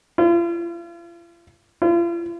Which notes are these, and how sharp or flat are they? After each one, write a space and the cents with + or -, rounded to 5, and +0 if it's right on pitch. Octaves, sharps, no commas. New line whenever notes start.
F4 -40
F4 -40